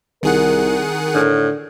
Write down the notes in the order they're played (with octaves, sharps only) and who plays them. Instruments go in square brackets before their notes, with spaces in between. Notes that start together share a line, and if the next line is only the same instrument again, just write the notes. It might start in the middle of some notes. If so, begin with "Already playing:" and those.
[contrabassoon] C2 [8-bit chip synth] D#3 G#4 F#5 [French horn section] A#4
[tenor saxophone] A2 [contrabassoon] D3